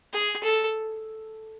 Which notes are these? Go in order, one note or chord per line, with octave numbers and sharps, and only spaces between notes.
G#4
A4